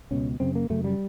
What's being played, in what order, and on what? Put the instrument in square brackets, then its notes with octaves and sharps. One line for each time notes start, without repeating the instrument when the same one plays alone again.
[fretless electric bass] C#2 B2 C#4
F#2 C#3 C4
A#3
F#2 C#3 A3
G3